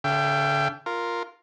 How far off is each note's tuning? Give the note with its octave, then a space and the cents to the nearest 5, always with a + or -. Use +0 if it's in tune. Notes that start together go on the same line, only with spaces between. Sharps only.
D3 -40 E5 +45 G5 +0
F4 +0 A#4 +0